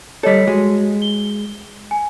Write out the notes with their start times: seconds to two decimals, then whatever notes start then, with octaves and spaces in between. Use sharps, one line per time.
0.23 G3 A4 C#5 D#5 B6
0.47 G#3 F#4
1.02 G7
1.91 G#5